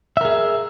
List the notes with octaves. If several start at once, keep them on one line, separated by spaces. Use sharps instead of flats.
G#4 A#4 E5